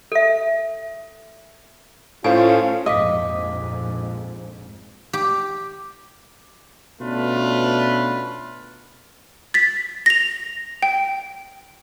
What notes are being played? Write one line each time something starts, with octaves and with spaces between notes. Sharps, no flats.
A4 E5
A2 C#4 F4 A4 C5 F5 G#5
A#1 F2 G#2 D#5 F5 D6 B6
G4
B2 A3 C#4 D4 F4 B4
A6 B6
A#6 F7
G5